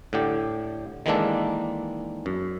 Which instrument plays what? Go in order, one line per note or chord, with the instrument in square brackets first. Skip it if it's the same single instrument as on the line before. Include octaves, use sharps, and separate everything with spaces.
[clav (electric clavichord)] A2 D3 G4
D#3 E3 G#3 A#3 D4 A4
F#2